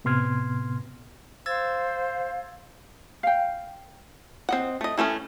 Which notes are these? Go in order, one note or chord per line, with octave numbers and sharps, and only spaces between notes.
A2 C3 B3 C6 F6 G#6
C5 F5 E6 G#6 A6
F5 G5
C4 D#5 F#5
A3 D#5
E3 A3 C4 C#4